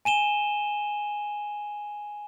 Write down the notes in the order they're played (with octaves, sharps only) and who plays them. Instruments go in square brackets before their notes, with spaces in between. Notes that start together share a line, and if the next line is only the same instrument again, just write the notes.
[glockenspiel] G#5 D#7 E7 G7